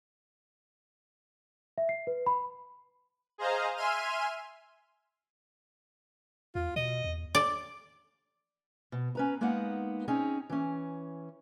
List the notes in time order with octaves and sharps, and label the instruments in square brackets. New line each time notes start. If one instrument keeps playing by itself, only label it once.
[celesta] E5
C7
B4
B5
[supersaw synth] G#4 C5 D#5 F5 A#5
E5 G#5 C6 F6 D#7
[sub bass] E2 [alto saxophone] F4
[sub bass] B2 [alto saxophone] D#5
[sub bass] E2
[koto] D5
[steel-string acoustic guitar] B2
C#4 B4 A#5
G#3 A#3 B3 D#4 F#5
C4 C#4 D#4 G#4
E3 C#4